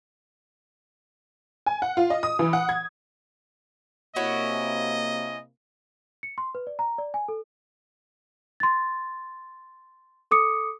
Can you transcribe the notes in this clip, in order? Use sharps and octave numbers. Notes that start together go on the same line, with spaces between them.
G#5
F#5
F4
D#5
D#6
E3
F#5
G#6
C3 A#3 C#4 E4 F#4 D#5
C#7
C6
B4
D5
A#5
D5
G#5
A4
C6 A6
A4 D6 D#6 C#7